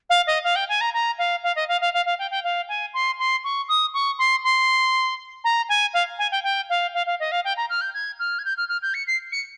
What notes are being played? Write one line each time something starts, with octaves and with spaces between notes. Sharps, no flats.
F5
D#5
F5
G5
G#5
A#5
A#5
F5
F5
D#5
F5
F5
F5
F5
G5
G5
F5
G#5
C6
C6
C#6
D#6
C#6
C6
C6
A#5
G#5
F5
G#5
G5
G5
F5
F5
F5
D#5
F5
G5
A#5
F6
G6
G#6
F6
G#6
G6
F6
F6
G6
C#7
C7
C#7